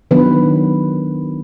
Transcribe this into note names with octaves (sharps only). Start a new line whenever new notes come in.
D#3 F#3 B3 D4 B4